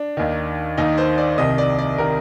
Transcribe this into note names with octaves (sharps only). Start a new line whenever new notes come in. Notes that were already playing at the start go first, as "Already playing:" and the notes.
Already playing: D4
D#2 D#3
D#2 D#3 D#4
C5
D5
C2 C3 D#3 D#5
D5
D5
C3 D#3 A#4